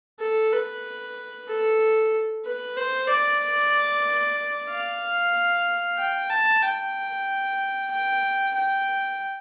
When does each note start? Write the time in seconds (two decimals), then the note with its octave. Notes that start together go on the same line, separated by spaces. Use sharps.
0.20 A4
0.52 B4
1.48 A4
2.45 B4
2.77 C5
3.09 D5
4.69 F5
5.98 G5
6.30 A5
6.62 G5
7.91 G5
8.55 G5